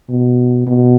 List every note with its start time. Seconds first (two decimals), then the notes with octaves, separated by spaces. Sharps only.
0.10 B2
0.67 B2